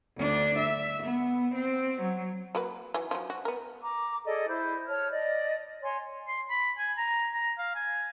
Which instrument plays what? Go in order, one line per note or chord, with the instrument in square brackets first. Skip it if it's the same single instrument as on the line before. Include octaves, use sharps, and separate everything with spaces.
[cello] D2 D4
E5
B3
C4
F#3
[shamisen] F#3 A#3 B4
E3 F#3
F3 F#3
F#4
B3 A#4
[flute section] A#5 D6
G#4 A4 D5 D#5
E4 C5 G6
C#5 A5 F6
D5 D#5
C#5 G#5 C6
[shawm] C6
B5
G#5
A#5
A#5
F5
G#5